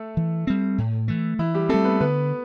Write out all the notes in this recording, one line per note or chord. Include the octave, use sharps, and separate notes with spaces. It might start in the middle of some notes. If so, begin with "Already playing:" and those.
Already playing: A3 A4
E3
G3 C4
A2
E3 A3
E3 E4
G3 G4
G3 A3 C4 A4
B3 B4
D3 B3 B4